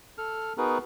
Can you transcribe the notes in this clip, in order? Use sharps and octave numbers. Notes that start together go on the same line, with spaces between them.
A4 F6
B3 D#4 F#4 G#4 A#4 B4